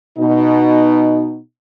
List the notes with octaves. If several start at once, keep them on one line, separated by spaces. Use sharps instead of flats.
B2 D#4